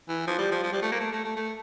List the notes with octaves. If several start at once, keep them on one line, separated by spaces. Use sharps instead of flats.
E3
F3
G3
F3
F3
G3
A3
A#3
A3
A3
A3
A3